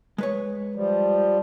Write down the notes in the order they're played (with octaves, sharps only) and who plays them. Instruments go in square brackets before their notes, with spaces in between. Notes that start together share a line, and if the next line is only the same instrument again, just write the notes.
[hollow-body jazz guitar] G#3 B4 C#5
[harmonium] F3 G3